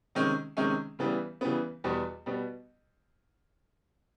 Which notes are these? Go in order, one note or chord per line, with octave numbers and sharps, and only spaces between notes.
C3 D#3 G#3 C#4
C3 D#3 G#3 C#4
C#3 E3 G3 B3
C#3 E3 G3 B3
E2 B2 G3 B3
B2 G3 B3